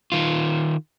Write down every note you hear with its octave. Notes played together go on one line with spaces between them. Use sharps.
D#3 F4